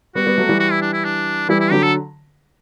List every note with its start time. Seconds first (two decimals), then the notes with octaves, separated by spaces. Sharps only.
0.15 G3 B3 F#4
0.26 G3 B3
0.38 F#3 A3
0.49 E3 G3
0.60 F#4
0.71 E4
0.82 D4
0.93 E4
1.05 D4
1.49 E3 G3 E4
1.60 E4
1.71 D3 F#3 G4
1.83 A4